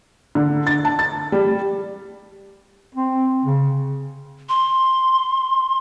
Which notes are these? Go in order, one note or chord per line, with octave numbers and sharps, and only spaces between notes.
D3
A6
A5
A6
G3
C4
C#3
C6